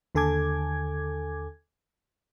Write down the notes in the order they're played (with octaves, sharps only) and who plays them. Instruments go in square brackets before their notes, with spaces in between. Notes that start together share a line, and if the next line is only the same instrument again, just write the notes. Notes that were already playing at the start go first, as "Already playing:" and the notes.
[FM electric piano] D#2 D3 A4 G#5 D6 G#6